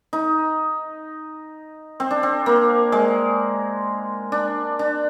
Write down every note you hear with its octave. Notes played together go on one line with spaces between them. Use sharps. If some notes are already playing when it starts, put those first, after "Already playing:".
D#4
C4
D4
C4
A#3
G#3
D4
D4